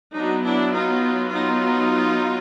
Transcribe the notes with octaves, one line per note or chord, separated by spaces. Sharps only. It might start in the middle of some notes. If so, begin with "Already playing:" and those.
F#3 B3 D4 D#4
D4 E4
D#4 F4
D#4 F4